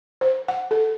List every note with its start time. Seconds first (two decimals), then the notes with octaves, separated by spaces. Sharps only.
0.21 C5
0.48 F#5
0.71 A4